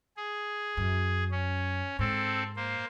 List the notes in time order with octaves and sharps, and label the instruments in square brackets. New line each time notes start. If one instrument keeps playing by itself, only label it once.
[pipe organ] G#4
[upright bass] F#2
[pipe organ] C#4
[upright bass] G#2 [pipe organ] C4 A4
[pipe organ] A#3 C5